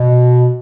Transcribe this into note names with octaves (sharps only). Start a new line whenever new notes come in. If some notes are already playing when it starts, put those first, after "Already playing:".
Already playing: B2